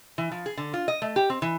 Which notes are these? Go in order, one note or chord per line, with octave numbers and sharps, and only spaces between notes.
E3
F3
G#4
D3
F4
D#5
A3
G4
C4
E3